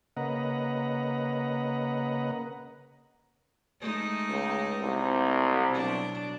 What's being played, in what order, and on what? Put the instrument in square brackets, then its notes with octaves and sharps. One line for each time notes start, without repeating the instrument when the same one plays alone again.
[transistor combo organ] C#3 A#3 B4 D#5 F#5 A#5
[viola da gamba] G#3 A3 D#4
[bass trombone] C#2
C2
[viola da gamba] B2 F#3 D4